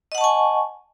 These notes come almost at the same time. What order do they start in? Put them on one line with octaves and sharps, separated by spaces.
D#5 F#5 A5 C#6 G#5